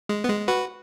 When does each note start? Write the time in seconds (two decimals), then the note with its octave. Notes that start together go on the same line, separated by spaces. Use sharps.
0.09 G#3
0.24 B3
0.28 G#3
0.48 F#4 B4